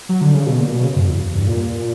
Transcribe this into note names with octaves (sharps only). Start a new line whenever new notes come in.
F#3
D3
C#3
B2
A#2
B2
C#3
F#2
E2
G2
A#2